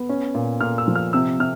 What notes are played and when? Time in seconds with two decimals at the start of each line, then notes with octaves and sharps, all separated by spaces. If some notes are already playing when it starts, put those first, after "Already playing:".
Already playing: B3
0.09 C#4
0.34 A#2
0.61 A#2 F6
0.78 E6
0.88 F3
0.95 F6
1.13 C3 E6
1.40 C3 F6